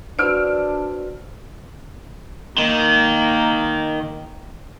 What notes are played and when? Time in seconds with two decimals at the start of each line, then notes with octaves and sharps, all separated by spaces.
0.19 D4 F#4 B4 C5 E6 F6 D7
2.58 D#3 A#3